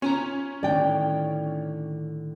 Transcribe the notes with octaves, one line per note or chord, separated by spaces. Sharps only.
C#4 F4 G#5 A#5
A2 D3 D#3 D5 G5